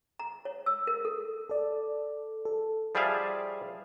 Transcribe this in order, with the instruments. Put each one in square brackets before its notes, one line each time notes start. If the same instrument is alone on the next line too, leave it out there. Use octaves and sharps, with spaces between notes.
[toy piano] A#5
C#5
E6
A#4
A4
[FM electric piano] A4 D5
A4
[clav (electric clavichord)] F3 G3 G#4 D5 E5 F5